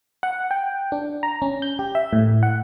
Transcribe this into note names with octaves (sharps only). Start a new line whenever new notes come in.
F#5
G5
D4
A#5
C#4
G6
G4
E5
A2
F#5